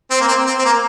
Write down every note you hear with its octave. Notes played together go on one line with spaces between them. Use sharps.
C4
A#3
C4
C4
C4
A#3